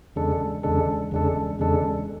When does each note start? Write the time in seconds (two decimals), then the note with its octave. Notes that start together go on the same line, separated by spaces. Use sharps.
0.16 E2 C#3 G#3 D4 A4
0.63 E2 C#3 G#3 D4 A4
1.11 E2 C#3 G#3 D4 A4
1.59 E2 C#3 G#3 D4 A4